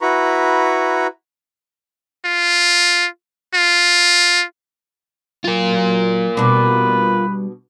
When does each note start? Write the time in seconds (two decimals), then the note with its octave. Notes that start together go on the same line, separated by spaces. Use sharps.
0.01 E4 F#4 B4 A#5 B5 C#6
2.25 F4
3.54 F4
5.44 F#3 F4 A#4
6.37 B2 G3 D4 B4